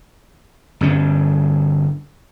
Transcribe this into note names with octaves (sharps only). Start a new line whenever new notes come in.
G1 G2 C#4